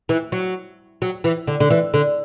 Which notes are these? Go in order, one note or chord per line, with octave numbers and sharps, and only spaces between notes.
E3
F#3
F#3
E3
D3
D3
E3
D3